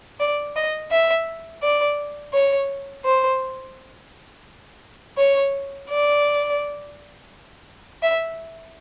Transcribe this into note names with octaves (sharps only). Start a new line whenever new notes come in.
D5
D#5
E5
D5
C#5
C5
C#5
D5
E5